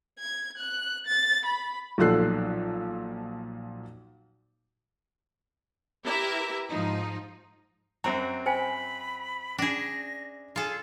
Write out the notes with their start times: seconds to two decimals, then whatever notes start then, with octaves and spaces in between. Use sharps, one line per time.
0.19 G#6
0.58 F#6
1.07 A6
1.45 B5
1.98 B1 A#2 F3 A4 F#6 C7
6.06 E4 G4 A#4 B4 E5
6.69 G#2 F3 D#4
8.04 F#2 C4 F#4 A#5
8.46 C5 G5 G#5 B5
9.59 C#4 D4 G#4 A#6
10.56 F4 G#4 A4